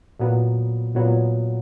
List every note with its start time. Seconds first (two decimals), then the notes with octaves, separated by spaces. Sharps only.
0.19 A#2 F#3 B3
0.95 A#2 F#3 B3